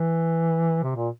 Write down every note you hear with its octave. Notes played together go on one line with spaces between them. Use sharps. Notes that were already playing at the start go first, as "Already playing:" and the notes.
Already playing: E3
C3
A#2